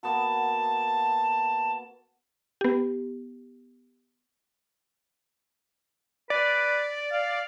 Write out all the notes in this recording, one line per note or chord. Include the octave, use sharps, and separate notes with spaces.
A#3 B3 F#4 A5
B3 G4
B4 D5
F5